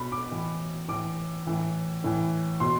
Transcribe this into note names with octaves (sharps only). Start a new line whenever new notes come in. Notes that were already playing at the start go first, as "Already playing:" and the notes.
Already playing: B2 B5
D6
A2 E3
A2 E3 D6
A2 E3
A2 E3
B2 C6